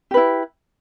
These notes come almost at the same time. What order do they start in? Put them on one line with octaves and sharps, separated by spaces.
G4 B4 E4